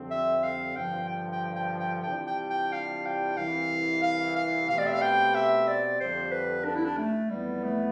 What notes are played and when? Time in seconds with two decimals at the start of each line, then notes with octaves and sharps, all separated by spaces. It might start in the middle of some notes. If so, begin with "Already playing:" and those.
Already playing: F2 D3 G3 C4
0.11 E5
0.43 F5
0.76 G2 D3 F3 G5
1.09 G5
1.32 G5
1.56 G5
1.79 G5
2.03 C3 E3 G3 D4 F4 G5
2.27 G5
2.50 G5
2.72 F5
3.06 G5
3.37 C2 C3 E3 F5
4.03 F5
4.36 F5
4.68 B2 A3 C4 G4 B4 F5
4.78 D5
4.86 E5
4.93 F5
5.01 G5
5.35 E5
5.67 D5
6.00 F2 D3 G3 C5
6.32 B4
6.65 D4
6.75 E4
6.85 D4
6.98 A3
7.30 F2 E3 G3 B3
7.64 A3